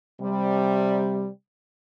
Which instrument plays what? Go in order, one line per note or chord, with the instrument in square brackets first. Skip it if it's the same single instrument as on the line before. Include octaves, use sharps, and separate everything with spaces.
[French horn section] C3 G3